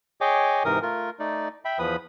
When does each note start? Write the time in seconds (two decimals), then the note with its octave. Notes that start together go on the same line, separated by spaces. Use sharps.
0.21 G#4 C#5 D#5 G5 G#5 D6
0.65 G#2 C3 E3 A#4 D#6
0.82 A3 F4 A#4
1.19 A3 D#4 D5
1.65 E5 G5 B5
1.79 E2 F3 B4 B5 D#6